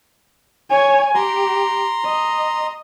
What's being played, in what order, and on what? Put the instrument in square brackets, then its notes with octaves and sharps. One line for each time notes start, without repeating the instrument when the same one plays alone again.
[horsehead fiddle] C#5 G#5
[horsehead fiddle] G4 [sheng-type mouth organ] A#5 C6
[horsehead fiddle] D#5